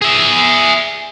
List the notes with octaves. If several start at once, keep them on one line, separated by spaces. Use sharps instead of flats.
G#4 E5